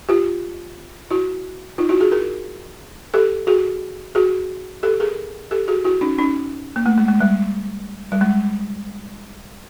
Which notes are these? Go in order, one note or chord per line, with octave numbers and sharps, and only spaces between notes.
F4 G4
E4 F#4
D#4 F4
E4 F#4
F#4 G#4
G#4 A#4
G4 A4
F#4 G#4
F#4 G#4
G4 A4
G#4 A#4
G4 A4
F#4 G#4
E4 F#4
C#4 D#4
C#4 D#4
A#3
A3
G#3
G#3
G3
G3
G#3